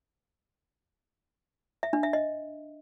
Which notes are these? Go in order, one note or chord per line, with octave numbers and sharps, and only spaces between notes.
E5
D4
E5
D#5